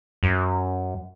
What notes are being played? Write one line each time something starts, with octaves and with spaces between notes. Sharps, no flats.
F#2